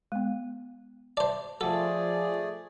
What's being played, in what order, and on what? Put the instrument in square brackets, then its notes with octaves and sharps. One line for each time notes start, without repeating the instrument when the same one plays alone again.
[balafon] G#3 B3
[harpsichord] C5 D5 [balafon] E5 A5
[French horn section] F3 [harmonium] A3 G#4 D5 [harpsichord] A4 [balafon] F#5 G#5 A5